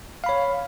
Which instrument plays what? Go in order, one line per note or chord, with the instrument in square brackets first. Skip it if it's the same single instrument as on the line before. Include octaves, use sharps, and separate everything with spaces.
[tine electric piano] F5
B5
C#5